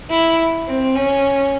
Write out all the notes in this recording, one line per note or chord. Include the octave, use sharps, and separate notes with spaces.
E4
C4
C#4